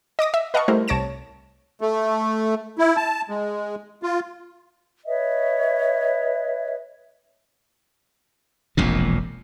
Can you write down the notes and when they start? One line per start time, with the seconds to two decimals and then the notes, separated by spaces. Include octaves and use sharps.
0.19 D#5 D6 D#6 A#6
0.34 E5
0.54 B4 D#5 F5 F#5 A5 C#6
0.68 G3 A3 E4 A#4 C5
0.88 C2 C#5 A5 A#6 D7 E7
1.81 A3
2.78 E4
2.97 A5
3.29 G#3
4.03 F4
5.06 B4 C#5 D#5 E5
8.77 E1 A#1 F2 A#2